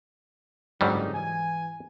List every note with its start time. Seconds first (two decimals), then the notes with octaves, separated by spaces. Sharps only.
0.81 F#1 G#2 D3 F#3 G3 D#4
1.13 E3 G#5